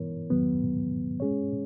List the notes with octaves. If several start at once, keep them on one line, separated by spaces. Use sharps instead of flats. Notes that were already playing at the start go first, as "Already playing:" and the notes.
Already playing: E3 B3 E4 A#4 C#5
E2 D#3 F#3 B3
G#3 C#4 G#4 C#5